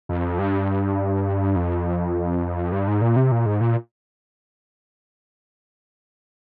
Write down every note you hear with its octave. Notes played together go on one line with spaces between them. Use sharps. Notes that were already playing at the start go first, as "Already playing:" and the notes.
F2
G2
F2
G2
G#2
A#2
C3
A#2
G#2
A#2